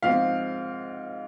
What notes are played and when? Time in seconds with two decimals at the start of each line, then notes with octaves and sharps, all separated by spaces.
0.03 G#2 F3 C4 F5